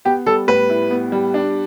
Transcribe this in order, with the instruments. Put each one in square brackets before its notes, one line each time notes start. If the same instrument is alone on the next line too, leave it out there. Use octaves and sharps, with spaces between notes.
[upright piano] B3 [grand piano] G4
[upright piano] G3 [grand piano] A4
[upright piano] A2 [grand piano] B4
[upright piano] E4
B3
G3
D4